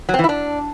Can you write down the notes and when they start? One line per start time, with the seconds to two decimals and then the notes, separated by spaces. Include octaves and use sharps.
0.09 F#3
0.14 C4
0.19 E3
0.24 E4
0.29 D4